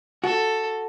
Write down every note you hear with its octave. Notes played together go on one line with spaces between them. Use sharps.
F#4 A4